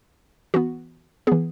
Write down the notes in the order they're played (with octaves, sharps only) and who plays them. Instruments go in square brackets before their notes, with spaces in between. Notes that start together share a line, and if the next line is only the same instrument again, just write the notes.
[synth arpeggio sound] E3 B3 F#4
E3 B3 G#4